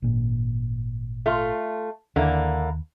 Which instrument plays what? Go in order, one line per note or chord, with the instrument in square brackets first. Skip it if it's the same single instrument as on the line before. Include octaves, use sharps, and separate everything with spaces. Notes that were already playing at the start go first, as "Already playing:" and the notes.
[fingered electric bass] G#1 A#2
[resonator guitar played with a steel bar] A3 F4
[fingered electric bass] D#2 [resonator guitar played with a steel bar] D3 A#3 E4